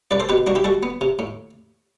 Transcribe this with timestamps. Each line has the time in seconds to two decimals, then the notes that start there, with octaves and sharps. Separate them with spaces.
0.11 C2 B4 D5
0.20 A4 C5
0.29 B2 G4 B4
0.47 C2 D4 F#4
0.55 E4 G4
0.64 G3 F#4 A4
0.83 B3
1.01 C3
1.19 A2